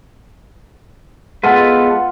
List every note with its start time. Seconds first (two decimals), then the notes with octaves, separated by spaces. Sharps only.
1.44 G#3 B3 F4 A4 B4 F#5